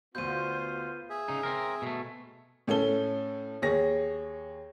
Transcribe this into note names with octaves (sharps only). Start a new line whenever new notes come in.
D2 B2 B3 F4 C5 G6 D#7
G#4 E5
C#3 D#4
C4 A#4
B2 A3
A2 C#4 A4 G7
D#2 G#4 C#5 A#6